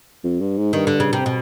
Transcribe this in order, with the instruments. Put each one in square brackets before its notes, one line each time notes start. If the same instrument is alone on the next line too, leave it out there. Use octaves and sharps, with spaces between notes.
[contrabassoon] F2
G2
G#2
[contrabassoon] G2 [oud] D#3
[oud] D3
C#3
C3
B2